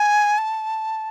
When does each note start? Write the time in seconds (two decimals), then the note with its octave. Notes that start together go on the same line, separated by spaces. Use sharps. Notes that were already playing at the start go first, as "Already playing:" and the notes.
Already playing: G#5
0.38 A5